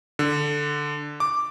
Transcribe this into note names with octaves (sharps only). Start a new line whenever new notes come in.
D3
D6